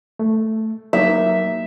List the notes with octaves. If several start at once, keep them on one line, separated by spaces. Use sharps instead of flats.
A3
F#3 A#3 D#4 E5